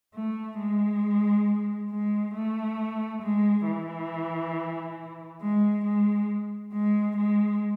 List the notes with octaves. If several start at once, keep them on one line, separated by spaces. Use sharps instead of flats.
A3
G#3
G#3
A3
G#3
E3
G#3
G#3
G#3
G#3